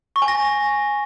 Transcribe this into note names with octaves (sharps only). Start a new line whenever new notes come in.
C#6
G#5
A#6